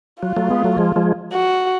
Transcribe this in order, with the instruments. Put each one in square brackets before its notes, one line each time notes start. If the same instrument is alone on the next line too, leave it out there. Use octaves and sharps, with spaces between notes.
[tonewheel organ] F#3 [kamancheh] F4
[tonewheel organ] F#3 A3
G#3 B3
F#3 A3
F3 G#3
F3 G#3
[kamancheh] F#4